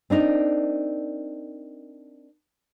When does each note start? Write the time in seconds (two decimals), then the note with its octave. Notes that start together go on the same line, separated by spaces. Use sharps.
0.10 C4 D4 D#4 A#4